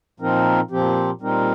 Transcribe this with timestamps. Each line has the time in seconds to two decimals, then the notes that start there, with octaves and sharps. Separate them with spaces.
0.20 A#2 F3 C4 D#4 A#4
0.71 A#2 F3 C4 G4
1.21 A#2 G3 C4 D#4 A#4